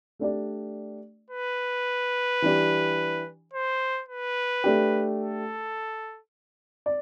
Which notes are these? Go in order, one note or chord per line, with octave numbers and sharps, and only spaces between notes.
A3 D4 G4 D5
B4
E3 G3 D4 G4
C5
B4
A3 D4 G4
A4
D5